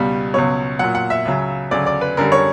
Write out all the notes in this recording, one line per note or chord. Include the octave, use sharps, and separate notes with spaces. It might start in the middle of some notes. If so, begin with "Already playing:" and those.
Already playing: C#2 B2 G3
C#2 B2 F#3 C#5
A#2 F#3 F#5
F#5
E5
C#2 C#3 F#3
D2 C#3 F#3 D5
D5
B4
F#2 D3 G3 A#4
C#5